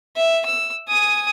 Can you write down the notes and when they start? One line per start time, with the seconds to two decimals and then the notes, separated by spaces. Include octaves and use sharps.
0.17 E5
0.45 E6
0.89 G#5 D#6